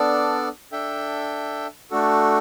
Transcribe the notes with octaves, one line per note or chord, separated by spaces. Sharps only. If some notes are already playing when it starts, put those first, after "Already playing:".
Already playing: B3 D4 A4 D5
D4 A4 E5 G5
A3 D4 F#4 A4